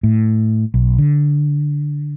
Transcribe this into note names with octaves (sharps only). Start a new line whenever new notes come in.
A2
B1
D3